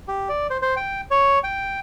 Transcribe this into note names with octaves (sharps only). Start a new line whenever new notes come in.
G4
D5
C5
C5
G5
C#5
G5